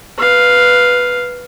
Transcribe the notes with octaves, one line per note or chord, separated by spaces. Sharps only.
B4 F5